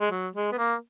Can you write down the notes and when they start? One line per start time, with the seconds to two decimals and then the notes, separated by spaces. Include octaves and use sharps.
0.01 G#3
0.11 F#3
0.35 G#3
0.52 B3
0.58 A#3